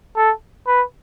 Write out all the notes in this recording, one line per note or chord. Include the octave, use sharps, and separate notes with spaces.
A4
B4